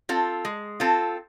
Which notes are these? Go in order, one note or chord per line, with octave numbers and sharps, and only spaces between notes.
C4 F4 A4
G#3
C4 F4 A4